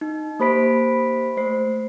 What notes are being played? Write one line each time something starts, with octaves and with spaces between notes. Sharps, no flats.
D#4
A#3 G4 C5 B5 B6 D7
A3 C5 C7